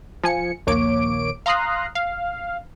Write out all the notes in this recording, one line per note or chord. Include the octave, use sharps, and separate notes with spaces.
F3 G#5 C#7
A#1 D#2 A#3 C#5 D6 D7
F5 A#5 C6 D#6 F#6 C7
F5